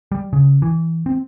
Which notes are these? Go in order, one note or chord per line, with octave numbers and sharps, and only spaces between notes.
G3
C#3
E3
C4